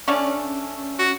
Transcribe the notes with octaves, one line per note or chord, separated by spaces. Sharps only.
A3 C#4 D4 F5
F#4